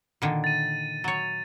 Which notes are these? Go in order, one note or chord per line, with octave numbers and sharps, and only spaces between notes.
A#2 D3 D#3
A6 D#7
F#3 C#5